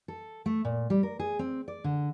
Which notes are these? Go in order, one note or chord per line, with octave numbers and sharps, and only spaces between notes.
A4
A3
A#2
G3
A#4
G#4
C4
D5
D3